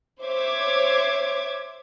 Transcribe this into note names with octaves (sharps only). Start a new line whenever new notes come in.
C5 C#5 E5 D6 G#6